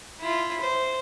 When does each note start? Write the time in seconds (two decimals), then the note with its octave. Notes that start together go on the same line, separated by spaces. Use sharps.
0.20 E4 F4
0.61 C5